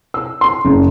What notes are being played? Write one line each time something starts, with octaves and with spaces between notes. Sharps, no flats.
E6
C6
F#1